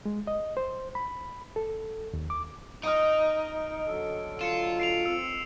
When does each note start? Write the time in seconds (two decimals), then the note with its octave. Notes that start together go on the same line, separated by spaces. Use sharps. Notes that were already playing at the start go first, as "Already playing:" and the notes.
0.06 G#3
0.27 D#5
0.57 C5
0.95 B5
1.56 A4
2.13 D#2
2.30 D6
2.83 D#4 D#5 G#5 F6 D7
3.86 D3 F#3 A4
4.41 F4 C#7 E7
4.80 C7 D7 F7
5.06 C4 E6